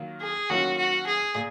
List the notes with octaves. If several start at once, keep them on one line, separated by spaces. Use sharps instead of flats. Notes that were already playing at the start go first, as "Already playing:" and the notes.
Already playing: D#3 F#3 A#3 F4
G#4
D#3 F#3 A#3 C#4 F4 F#4
F#4
G#4
A#2